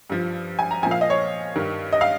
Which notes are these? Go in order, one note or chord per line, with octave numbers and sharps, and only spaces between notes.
G2 F3
G#5
A#5
A#2 F3 F5 G#5
D#5
C#5
G2 D#3
D#5
F5